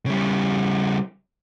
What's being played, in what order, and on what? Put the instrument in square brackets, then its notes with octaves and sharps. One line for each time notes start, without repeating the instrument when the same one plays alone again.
[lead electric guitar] C#3 G3